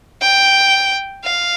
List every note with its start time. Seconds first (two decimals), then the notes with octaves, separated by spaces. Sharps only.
0.22 G5
1.25 F5